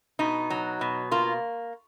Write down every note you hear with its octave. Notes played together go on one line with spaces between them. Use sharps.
B2 D#4
F#3
B2
A#3 F4